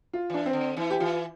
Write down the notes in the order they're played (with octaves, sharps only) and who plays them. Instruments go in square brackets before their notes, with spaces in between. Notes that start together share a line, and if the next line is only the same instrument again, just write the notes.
[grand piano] F4
[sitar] E3 [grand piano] D4
[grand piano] C4
[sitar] D3
[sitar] E3 [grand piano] E4
[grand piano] G4
[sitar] E3 [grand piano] F4